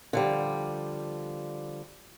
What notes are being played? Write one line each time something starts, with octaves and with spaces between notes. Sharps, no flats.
D3 F3 G3